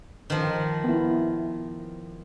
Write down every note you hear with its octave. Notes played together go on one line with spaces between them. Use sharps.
D#3 F3
B3 E4